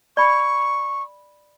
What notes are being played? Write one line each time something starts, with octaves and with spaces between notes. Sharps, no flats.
D5 B5 C#6